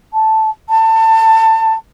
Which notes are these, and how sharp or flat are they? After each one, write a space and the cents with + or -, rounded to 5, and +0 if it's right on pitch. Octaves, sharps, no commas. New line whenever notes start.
A5 -5
A5 +25